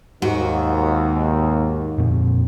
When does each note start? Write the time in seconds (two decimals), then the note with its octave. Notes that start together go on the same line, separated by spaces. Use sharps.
0.22 D#2 G#2 F#4
1.98 F2 A#2 C4